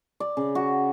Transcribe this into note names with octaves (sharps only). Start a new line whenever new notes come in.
D5
C#3
F#4